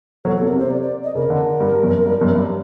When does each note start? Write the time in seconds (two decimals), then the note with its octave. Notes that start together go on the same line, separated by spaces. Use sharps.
0.25 F#3 A4
0.37 C3 A4
0.48 A#4
0.56 C3 C5
0.70 D5
0.82 D5
1.04 D#5
1.15 C#3 A#4
1.30 D3
1.60 G2
1.83 F#2
2.06 G2
2.21 F#2
2.35 G2